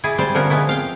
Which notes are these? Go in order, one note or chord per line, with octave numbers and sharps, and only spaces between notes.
E4 G#4 D5
G3 C5 D5
D3 F3 B3 C#4 F#4 A#4
F3 G#3 B3 E4
C4 F5 G5